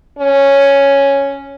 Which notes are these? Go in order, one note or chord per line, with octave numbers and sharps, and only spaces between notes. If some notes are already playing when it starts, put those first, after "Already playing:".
C#4